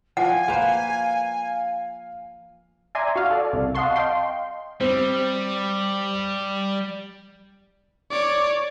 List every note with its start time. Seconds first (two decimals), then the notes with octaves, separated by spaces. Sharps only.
0.17 F3 F#5 G#5
0.48 A#3 B4 C5 F5
2.95 D5 E5 G#5 A#5 C6
3.16 F#4 F5
3.30 A4 D5
3.53 C2
3.75 D#5 F5 F#5 A5 C6 C#6
3.96 D#5 F5 G5 C6
4.81 G3 C4
8.10 C#5 D5